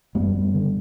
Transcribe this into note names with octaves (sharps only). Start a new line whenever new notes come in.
F#2 G3 B3
D3